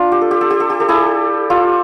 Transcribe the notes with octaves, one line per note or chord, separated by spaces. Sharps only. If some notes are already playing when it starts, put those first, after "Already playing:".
Already playing: D4 F4
G4
A4
G4
A4
G4
A4
G4
A4
E4 G4
F4 A4